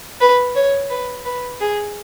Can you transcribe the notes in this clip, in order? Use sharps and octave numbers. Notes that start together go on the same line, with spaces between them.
B4
C#5
B4
B4
G#4